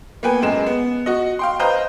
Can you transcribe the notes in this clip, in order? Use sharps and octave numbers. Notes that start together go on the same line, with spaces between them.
A#3 B3 B4 G5 G#5
F#2 G#3 E7
B3
F#4 D#5
F5 G5 C6
B4 C5 D#5 F5 A#5 G6